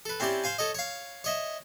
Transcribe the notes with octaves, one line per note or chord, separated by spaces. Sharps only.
A4 B4
C4 C#4 E4 G4 D5
C5 F5 G#5
A4 C#5 D#5
C#5 F5
C#5 D#5 E5